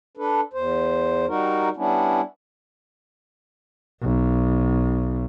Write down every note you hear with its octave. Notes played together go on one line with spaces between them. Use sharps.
D4 A4 B4
E2 C5
G3 D#4 F#4 A#4
G3 B3 C#4 D4 E4
B1